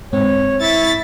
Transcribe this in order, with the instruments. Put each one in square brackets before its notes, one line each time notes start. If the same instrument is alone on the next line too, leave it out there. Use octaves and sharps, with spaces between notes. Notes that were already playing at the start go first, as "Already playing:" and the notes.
[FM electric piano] G#2 C4 [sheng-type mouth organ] C#5
[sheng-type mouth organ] E4 E5 C#6 [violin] A6 B6